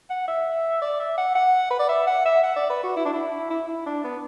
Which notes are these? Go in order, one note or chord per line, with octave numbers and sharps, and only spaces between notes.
F#5
E5
D5
E5
F#5
F#5
B4
D5
E5
F#5
E5
F#5
D5
B4
F#4
E4
D4
E4
E4
E4
D4
B3